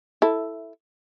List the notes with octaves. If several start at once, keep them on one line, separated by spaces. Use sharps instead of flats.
E4 A4